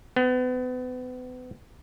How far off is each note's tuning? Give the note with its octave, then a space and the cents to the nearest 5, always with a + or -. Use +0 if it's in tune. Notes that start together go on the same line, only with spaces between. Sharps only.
B3 +35